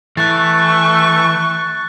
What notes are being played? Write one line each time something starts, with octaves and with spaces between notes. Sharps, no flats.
E3 A3 C#6 F#6 A6